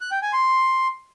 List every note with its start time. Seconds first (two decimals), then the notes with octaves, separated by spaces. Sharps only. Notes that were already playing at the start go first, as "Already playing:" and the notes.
0.01 F#6
0.12 G5
0.22 G#5
0.33 C6